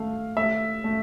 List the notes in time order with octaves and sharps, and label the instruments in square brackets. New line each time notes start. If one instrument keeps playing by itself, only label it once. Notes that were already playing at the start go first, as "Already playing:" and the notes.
Already playing: [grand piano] A3 [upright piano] F5
[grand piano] A3 [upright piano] E5
[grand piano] A3